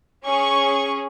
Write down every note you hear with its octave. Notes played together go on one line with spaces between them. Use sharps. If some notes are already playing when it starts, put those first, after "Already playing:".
C#4 G#4 C#6